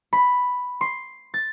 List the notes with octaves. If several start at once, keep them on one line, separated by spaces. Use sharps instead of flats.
B5
C6
A6